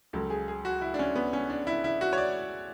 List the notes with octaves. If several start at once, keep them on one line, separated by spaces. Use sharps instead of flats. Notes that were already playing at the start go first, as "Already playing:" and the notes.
C#2 C#3 F#3 A4
G#4
G#4
F#4
E4
D4
C#4
B3
C#4
D4
E4
E4
F#4
C#5
D5